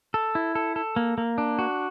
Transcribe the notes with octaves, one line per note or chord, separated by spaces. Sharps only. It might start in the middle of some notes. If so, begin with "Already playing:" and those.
A4
E4
A4
A4
A#3
A#3
D4
F#4